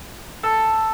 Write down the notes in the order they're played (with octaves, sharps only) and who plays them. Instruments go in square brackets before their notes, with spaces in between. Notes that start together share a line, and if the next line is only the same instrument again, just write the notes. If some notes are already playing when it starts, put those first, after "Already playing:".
[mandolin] A4